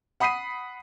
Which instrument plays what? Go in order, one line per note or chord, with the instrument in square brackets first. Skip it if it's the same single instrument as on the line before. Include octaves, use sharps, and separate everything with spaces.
[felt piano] F#5 B5 D#6 B6 C7 D#7